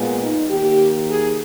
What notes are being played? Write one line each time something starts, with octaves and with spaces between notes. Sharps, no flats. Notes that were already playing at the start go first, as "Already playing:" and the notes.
Already playing: A#2 G#3 B3
D#4
D#2 D#3 A#3 G4
G#4